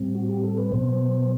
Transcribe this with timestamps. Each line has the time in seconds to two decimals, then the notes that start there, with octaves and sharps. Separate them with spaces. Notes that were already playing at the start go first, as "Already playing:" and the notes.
Already playing: A2 G3 C4
0.15 F#4
0.29 G4
0.44 A4
0.58 B4
0.72 B2 F#3 B3 C5